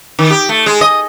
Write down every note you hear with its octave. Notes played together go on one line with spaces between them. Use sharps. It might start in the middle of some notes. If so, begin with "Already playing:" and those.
D#3
G4
A3
G#3
D#5